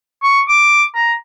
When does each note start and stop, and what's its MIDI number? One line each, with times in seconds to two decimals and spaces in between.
0.24 0.41 85
0.49 0.83 86
0.95 1.13 82